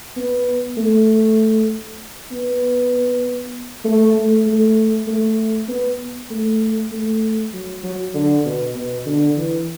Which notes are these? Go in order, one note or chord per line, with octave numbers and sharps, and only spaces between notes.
B3
A3
B3
A3
A3
A3
A3
B3
A3
A3
F#3
F#3
D3
B2
B2
D3
E3